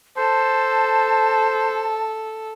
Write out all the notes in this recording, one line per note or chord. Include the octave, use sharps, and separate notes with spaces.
A4 C5 A5